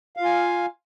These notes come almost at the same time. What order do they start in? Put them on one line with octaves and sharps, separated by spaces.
F5 F4 G#5